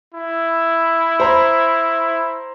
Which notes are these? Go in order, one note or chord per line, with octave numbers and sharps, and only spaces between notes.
E4
C5 A#5 B5